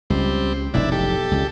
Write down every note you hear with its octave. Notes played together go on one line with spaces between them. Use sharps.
C#2 G3 C4
F1 B1 G#2 D4 E4
G4 A4
C#2